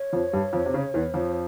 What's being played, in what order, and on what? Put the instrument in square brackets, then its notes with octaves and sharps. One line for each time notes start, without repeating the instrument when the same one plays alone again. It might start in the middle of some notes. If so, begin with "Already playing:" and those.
Already playing: [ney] C#5
[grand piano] F2 F3
G2 G3
F2 F3
C3
C#3
E2 E3
F2 F3